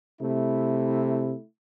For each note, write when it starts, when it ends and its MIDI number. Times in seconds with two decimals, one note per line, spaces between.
0.21 1.33 48
0.21 1.44 57
0.21 1.44 64